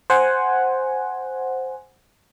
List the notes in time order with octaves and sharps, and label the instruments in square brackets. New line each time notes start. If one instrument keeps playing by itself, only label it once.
[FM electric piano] C5 F#5 G#5